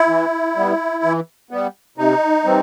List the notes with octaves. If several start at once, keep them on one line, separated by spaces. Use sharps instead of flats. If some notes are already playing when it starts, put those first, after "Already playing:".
Already playing: E4
E3
G3 B3
E3
G3 B3
C3 D#4
E3 G3 C4